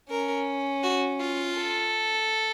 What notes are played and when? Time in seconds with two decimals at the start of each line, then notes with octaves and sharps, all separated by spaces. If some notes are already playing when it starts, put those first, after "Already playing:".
0.10 C#4 A#4
0.83 F#4
1.20 F4
1.58 A4